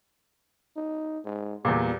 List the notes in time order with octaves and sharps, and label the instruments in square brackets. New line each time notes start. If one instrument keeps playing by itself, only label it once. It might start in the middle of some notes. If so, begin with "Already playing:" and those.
[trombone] D#4
G#2
[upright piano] E2 A#2 [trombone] G3